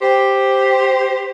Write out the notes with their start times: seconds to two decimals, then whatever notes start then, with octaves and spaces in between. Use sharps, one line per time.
0.01 G4 C5